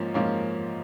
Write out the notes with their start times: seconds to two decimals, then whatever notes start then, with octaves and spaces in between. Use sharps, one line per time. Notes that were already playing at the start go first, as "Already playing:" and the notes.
Already playing: G#2 F3 A#3 C#4
0.14 G#2 F3 A#3 C#4